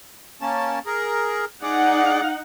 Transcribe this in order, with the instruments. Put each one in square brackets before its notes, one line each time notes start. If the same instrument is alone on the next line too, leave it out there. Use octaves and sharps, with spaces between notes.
[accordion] A#3 C#4 A5
G#4 A#4
[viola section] D#4 F#5 [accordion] G#4 D5